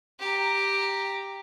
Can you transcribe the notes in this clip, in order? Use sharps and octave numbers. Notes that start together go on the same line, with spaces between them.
G4 A#5